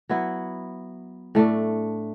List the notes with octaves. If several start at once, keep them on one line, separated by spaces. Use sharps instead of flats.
F#3 B3 E4
A2 A3 D4